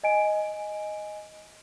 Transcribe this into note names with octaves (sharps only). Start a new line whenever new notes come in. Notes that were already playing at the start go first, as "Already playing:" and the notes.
D#5 G#5 D7